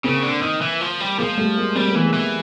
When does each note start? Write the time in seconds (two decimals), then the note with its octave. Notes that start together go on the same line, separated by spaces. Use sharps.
0.04 C#3 A#3 C4
0.24 D3
0.42 D#3
0.61 E3
0.81 F3
1.00 G3
1.18 F3 G#3 A#3
1.37 G3 A3
1.57 G#3 A#3
1.75 G3 A#3 C4
1.90 A3 B3
1.95 E3
2.04 G#3 A#3
2.13 E3